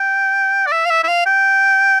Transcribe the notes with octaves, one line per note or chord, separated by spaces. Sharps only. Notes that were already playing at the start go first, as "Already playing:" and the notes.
Already playing: G5
D5
E5
F5
E5
E5
F5
G5